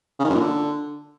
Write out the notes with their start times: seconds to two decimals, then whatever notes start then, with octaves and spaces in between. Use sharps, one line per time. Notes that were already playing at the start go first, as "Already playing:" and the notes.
0.19 C#3
0.24 D#3
0.30 F#2
0.35 A#2
0.40 D3